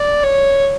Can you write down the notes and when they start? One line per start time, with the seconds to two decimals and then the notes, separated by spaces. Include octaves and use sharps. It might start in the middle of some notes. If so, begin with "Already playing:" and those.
Already playing: D5
0.24 C#5